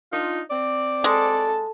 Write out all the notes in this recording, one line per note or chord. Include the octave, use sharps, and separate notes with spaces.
D4 D#4 F4
C4 D5
G#3 A4